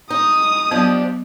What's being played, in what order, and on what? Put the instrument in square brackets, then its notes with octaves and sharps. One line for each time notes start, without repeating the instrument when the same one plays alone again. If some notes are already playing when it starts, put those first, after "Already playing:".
[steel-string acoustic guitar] D#4 [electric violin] D#6
[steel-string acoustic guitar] F3 D4 G4 [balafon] F#3 B3